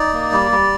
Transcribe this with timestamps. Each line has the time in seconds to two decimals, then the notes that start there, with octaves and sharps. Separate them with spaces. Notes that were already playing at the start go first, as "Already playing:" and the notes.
Already playing: D#4 D5
0.13 A#3
0.32 G3
0.52 G3